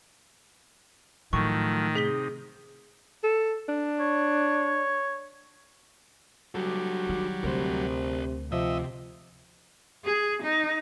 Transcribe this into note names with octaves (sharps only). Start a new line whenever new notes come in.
A2 D#3 F3 F#3 A3 C#6
C3 D#4 G#4 B6 G7
A4
D4
C#5
F#3 G3 F#4 A4
D#3
D2 C3 A#4 C5
C3 F3 D#5 E5
G#4
D#4